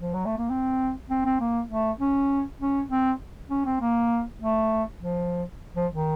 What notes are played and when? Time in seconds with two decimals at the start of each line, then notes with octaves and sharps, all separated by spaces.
0.01 F3
0.14 F#3
0.26 A3
0.38 A#3
0.50 C4
1.10 C4
1.25 C4
1.40 A#3
1.71 A3
2.00 C#4
2.61 C#4
2.90 C4
3.50 C#4
3.66 C4
3.81 A#3
4.41 A3
5.01 F3
5.76 F3
5.92 D#3